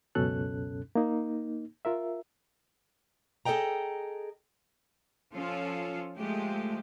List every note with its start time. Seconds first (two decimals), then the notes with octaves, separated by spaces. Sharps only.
0.15 C#2 F#2 B2 C#4 A4 F#6
0.95 A#3 D#4
1.85 F4 A#4 E5
3.45 G#4 A4 D5 D#5 G5 A#5
5.33 F3 C#4 F4 A4 F5
6.17 F3 G#3 A3 G4